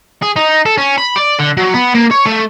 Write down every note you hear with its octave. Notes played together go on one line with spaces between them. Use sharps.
G#4
D#4
A4
C#4
B5
D5
D3
F#3
B3
A#3
C#5
A3